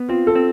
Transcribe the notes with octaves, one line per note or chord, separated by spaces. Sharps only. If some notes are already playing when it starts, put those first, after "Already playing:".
Already playing: B3
C4 F4
A4
C4